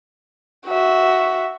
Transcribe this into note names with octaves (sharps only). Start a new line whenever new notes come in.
F#4 E5